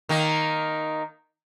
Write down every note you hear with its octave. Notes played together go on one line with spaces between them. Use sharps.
D#3 A#3